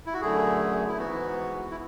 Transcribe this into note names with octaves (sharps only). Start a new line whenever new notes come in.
E4
F#4
F#2 D3 A3 G#4
E4
G#2 E3 B3 F#4
E4